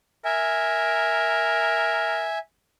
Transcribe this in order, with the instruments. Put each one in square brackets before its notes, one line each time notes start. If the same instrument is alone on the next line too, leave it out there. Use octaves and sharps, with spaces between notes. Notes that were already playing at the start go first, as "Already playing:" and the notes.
[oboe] A#4 [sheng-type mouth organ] E5 G#5